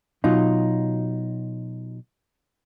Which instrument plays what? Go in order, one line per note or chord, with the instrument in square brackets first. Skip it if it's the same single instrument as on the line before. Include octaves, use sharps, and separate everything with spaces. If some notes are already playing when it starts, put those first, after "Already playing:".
[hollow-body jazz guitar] B2 F#3 D#4 F4